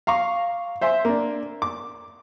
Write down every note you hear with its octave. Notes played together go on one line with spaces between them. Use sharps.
F5 A#5 C#6 D6
C5 E5 G#5 C6
A#3 D4
D6